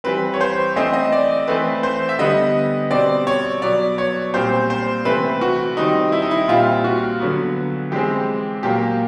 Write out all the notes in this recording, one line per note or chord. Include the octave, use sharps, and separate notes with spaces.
E3 G3 C4 B4
C#5
C5
E3 A3 C4 D#5
D#5
D5
E3 A3 C4 B4
C5
E5
D3 G3 B3 D#5
B2 G3 C4 D5
C#5
B2 F#3 B3 D5
C#5
A#2 G3 C4 C5
C5
C3 E3 A3 C4 B4
F#4
D#3 G3 C4 D#4
E4
D#4
E4
A#2 G3 C4 F4
F#4
D3 F#3 B3
E3 G#3 C4 G4
A#2 F#3 A#3 G4